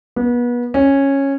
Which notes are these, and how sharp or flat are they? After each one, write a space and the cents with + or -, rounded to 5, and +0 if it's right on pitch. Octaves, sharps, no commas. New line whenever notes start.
B3 -30
C#4 -10